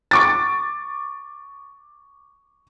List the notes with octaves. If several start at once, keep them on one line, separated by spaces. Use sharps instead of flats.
C#6 D6 A6